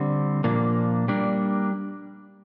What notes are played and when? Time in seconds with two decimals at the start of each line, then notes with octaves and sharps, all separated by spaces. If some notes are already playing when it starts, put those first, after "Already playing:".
Already playing: D3 G3 C4
0.44 A#2 F3 A#3 D4
1.08 G3 A#3 D4